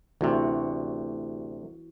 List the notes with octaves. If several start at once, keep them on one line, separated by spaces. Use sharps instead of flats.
D2 C3 E3 F#4